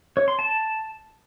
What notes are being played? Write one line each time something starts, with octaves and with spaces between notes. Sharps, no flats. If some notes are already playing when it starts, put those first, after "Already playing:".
C#5
C6
A5